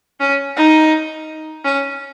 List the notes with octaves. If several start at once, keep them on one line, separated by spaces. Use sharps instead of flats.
C#4
D#4
C#4